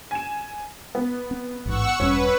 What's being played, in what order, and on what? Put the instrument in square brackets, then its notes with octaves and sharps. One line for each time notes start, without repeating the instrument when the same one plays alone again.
[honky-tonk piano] G#5 E7
B3
[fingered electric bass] C4
[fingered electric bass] A1 G#2 [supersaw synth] F#5 C#6 E6
[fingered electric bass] E1 G2 [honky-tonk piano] C#4 [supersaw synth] B4